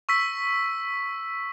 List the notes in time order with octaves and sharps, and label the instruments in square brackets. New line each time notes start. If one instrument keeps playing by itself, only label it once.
[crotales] C#6 E6 B6